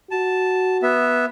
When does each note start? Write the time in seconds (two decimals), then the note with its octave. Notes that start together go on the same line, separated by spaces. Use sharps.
0.11 F#4 A5
0.82 B3 E5